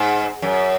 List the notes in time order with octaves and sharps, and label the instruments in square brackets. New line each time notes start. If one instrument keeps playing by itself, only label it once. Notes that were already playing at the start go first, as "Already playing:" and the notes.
Already playing: [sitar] G#2
F#2